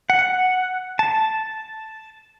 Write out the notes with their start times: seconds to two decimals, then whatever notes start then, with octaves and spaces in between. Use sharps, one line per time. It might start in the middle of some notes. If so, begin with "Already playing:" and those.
0.10 F#5
0.99 A5